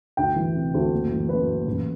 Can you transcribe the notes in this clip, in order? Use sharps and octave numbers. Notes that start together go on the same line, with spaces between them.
D2 G5
E3
C3
D2
F#1
E3
F#2 B4
F#1
A1